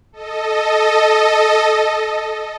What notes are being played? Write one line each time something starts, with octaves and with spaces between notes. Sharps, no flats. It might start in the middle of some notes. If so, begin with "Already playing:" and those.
A4 D#5